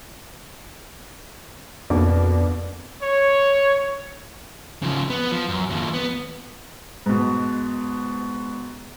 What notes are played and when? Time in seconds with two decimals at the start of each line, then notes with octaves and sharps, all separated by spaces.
1.90 F2 B2 A#3 D4
3.02 C#5
4.82 C#3 F3
5.10 B3
5.32 F3
5.49 F#2
5.70 D#2 F3
5.94 B3
7.06 G#2 B2